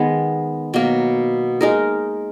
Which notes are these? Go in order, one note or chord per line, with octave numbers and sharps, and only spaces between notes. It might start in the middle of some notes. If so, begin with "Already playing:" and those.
Already playing: D#3 G#3 B3
B2 F#3 A#3
G#3 D#4 A#4